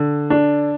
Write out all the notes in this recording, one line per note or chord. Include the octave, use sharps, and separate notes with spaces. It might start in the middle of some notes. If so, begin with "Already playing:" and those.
Already playing: D3
D4